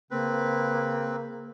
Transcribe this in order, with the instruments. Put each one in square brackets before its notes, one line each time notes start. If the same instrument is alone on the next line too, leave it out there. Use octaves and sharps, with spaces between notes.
[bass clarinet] C#3 [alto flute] A#3 [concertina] C4 B4